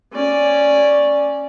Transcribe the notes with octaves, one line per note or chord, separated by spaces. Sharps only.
C#4 D5